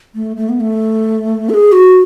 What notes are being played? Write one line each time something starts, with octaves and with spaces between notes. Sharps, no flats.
A3
A3
B3
A3
A4
G#4
F#4